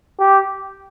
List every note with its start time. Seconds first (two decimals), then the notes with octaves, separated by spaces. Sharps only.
0.20 G4